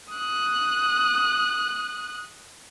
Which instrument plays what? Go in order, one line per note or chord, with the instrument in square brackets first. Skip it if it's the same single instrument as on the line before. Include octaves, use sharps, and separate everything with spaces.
[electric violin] D#6 F#6